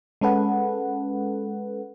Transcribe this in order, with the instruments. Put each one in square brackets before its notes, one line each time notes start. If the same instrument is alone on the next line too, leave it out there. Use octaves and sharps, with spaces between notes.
[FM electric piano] G#3 C#4 A4 B4 F#5